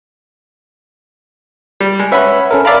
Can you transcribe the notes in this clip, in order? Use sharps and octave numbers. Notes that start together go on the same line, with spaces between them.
G3
G#3
C#4 B4 E5 F#5 B5
C#4 A4 A#4
A#4 D5 E5 F5 B5